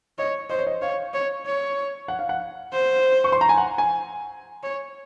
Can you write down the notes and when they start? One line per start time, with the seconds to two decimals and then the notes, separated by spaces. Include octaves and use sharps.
0.18 C#5 D#5
0.50 C5 D#5
0.59 C#5
0.67 D#5
0.82 C#5 F5
1.14 C#5
1.46 C#5
2.08 F#5
2.19 F5
2.29 F#5
2.73 C5
3.24 C#6
3.32 C6
3.41 A#5
3.49 G#5
3.58 F#5
3.78 G#5
4.63 C#5